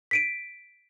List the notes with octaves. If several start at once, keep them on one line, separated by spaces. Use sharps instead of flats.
B6 D7 D#7